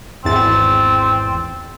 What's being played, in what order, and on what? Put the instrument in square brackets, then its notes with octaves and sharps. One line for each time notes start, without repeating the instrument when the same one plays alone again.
[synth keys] G#1 E2 A6 [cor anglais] C4